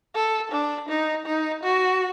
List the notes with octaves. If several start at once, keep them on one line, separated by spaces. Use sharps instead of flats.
A4
D4
D#4
D#4
F#4